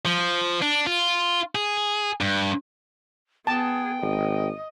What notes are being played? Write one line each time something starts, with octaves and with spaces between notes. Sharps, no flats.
F3
D4
F4
G#4
G2
B3 G#4 G5 A5
G#1 D#5